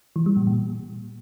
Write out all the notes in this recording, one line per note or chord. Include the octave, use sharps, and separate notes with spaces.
E3
G3
A#2
A#2